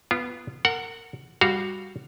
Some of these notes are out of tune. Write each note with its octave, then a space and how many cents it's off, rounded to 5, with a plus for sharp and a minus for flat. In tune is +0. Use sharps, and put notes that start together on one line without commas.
B3 +0 F4 -25
A#4 -30 F#5 +0
G3 +5 F#4 +0 F5 +0